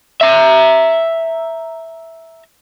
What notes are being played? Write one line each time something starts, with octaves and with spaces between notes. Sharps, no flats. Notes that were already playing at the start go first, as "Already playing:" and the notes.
E5 A#5